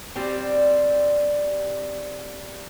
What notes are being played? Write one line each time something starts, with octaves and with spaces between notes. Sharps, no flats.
G3 C4